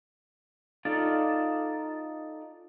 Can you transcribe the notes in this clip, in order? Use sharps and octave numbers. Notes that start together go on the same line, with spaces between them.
D#4 F4 A4 D5